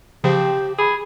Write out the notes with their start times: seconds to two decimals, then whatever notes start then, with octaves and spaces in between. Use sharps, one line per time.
0.24 C#3 F3 C4 G4
0.78 G#4 B5